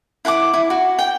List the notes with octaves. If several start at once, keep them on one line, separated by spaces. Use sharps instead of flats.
E4 F#5 G#5 D6
E4
F#4
G5